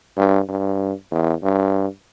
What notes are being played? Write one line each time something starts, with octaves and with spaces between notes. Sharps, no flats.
G2
G2
E2
G2